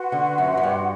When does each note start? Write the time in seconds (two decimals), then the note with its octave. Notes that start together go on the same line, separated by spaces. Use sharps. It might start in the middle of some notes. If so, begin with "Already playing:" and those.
Already playing: F#4 B4 F#5 C6
0.12 D3
0.38 F#2
0.57 F#2
0.63 G2